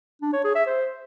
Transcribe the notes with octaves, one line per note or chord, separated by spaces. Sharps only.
D4
C#5
G#4
E5
C5